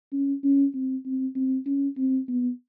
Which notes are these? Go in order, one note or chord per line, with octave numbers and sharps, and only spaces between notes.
C#4
C#4
C4
C4
C4
C#4
C4
B3